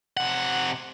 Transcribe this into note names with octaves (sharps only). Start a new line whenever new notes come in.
C3 F#5